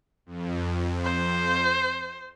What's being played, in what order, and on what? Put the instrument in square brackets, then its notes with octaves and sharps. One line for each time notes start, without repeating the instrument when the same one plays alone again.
[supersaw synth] F2
[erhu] C5